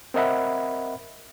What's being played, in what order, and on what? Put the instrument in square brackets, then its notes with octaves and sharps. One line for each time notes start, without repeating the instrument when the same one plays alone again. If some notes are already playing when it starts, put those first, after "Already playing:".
[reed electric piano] C4 A#4 D#5 E5 F#5 B5